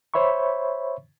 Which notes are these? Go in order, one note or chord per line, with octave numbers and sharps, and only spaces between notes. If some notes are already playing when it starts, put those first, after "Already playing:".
C5 C#5 E5 B5 C#6